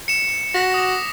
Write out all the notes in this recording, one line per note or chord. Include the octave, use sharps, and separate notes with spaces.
C#7 E7
F#4 A#6 B6
D6 D#6